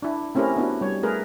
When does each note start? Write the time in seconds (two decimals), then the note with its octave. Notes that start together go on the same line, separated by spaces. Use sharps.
0.02 D4 E4
0.35 A3 C4 C#4 E4 G4 A#4
0.57 B3 D4 E4 F#4
0.81 G3 C#5
1.03 A3 G#4 A#4 B4